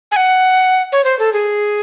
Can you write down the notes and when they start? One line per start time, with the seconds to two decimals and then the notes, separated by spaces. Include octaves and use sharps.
0.12 G#5
0.16 F#5
0.92 C#5
1.04 C5
1.19 A4
1.33 G#4